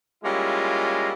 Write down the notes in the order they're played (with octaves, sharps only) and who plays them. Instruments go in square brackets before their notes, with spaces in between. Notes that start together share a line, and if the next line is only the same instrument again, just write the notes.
[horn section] G3 G#3 A#3 C#4 E4 F4